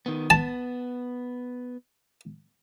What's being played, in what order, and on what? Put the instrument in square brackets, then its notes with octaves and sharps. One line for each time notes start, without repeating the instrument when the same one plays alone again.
[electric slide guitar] D#3 B3
[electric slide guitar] B3 [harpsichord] A5